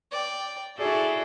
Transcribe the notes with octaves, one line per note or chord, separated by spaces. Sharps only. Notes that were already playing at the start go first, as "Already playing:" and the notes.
D5 G5
E4 F#4 G#4 A4 D5